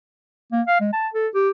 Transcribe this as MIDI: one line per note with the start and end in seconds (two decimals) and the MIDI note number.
0.52 0.62 58
0.68 0.80 77
0.80 0.89 56
0.93 1.08 81
1.14 1.28 69
1.35 1.50 67